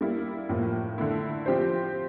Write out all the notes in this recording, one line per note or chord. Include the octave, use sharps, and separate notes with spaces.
G3 A#3 E4
A2 F3 A#3
D3 A3 E4
F3 C4 G4 C5